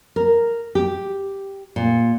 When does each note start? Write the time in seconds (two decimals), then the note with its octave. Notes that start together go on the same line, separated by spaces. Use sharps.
0.16 A#4
0.75 G4
1.76 A#2